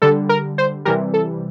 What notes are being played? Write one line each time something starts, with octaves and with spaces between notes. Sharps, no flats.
D3 G3 A4
A#4
C5
C3 E3 G3 A#4
A4